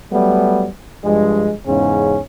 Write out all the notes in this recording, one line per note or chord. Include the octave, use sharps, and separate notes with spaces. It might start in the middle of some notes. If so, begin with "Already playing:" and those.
F#3 G3 A3 B3
G2 F3 G#3
E2 G#2 C#3 C#4